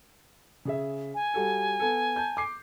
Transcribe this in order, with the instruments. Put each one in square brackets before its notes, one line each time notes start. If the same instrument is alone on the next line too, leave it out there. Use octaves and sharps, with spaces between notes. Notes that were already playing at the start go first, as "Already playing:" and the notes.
[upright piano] C#3 G#4 E5
[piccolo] G#5
[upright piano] G3 F#4 A4
B3 A4
A5 G6
D6 C7